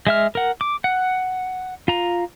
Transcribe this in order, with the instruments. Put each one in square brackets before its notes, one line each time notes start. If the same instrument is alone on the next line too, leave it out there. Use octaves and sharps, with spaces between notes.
[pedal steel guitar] G#3 E5 F6
A#4 F#5
D6
F#5
F4 A#5